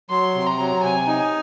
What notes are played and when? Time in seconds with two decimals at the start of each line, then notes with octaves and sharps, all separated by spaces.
0.10 F#3 C6
0.35 C3
0.47 A#5
0.59 F#3
0.83 C3 G#5
1.07 D#4